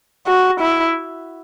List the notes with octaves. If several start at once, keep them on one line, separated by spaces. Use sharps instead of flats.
F#4
E4